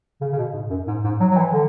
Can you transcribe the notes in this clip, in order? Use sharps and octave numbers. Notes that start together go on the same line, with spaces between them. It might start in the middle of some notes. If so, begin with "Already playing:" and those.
C#3
C#3
B2
G#2
F#2
G#2
G#2
F#3
F#3
E3
D3